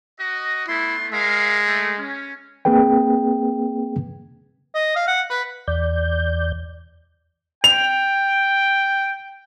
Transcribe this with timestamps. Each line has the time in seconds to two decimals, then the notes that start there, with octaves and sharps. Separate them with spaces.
0.20 F#4 D#5
0.68 A3 B3 E4 C6
1.12 G#3 A#4 E5 F5
1.67 A3
1.98 C#4
2.65 A#3 C4 G#4 B4 G5
4.75 D#5
4.96 F5
5.08 F#5
5.30 B4
5.68 E2 D5 G6
7.64 G5 F7